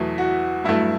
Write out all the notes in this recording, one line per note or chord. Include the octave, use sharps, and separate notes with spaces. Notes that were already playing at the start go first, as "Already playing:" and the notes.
Already playing: E2 B2 F#3 A3 E4
F#4
G2 F#3 A3 E4